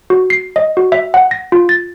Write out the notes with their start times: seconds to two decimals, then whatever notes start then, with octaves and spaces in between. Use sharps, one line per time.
0.10 F#4
0.30 C7
0.56 D#5
0.77 F#4
0.92 E5
1.14 F#5
1.31 A#6
1.52 F4
1.69 A6